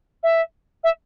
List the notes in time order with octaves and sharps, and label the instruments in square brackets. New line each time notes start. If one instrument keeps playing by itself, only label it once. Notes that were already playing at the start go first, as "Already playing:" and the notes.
[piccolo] E5
E5